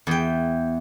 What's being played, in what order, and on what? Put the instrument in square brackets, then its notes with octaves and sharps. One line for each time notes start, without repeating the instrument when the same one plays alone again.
[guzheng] E2 G5